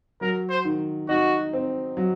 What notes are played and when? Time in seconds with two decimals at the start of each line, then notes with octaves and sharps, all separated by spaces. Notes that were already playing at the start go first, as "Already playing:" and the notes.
0.21 F#3 A#4
0.50 C5
0.65 D#3
1.09 D#4 F#4
1.53 C4
1.97 F#3